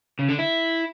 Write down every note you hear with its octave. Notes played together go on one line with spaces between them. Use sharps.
C#3
D3
E4